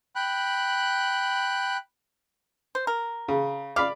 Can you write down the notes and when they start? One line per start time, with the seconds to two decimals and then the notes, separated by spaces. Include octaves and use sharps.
0.16 G5 B5 F#6
2.75 C5
2.87 A#4
3.28 C#3
3.76 D5 F5 B5 D6